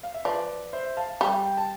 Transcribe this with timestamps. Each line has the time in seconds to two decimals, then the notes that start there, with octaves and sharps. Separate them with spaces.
0.03 F5
0.14 E5
0.25 F3 B4 D5
0.73 C5 E5
0.97 F5 A5
1.21 G3
1.46 G5
1.57 A5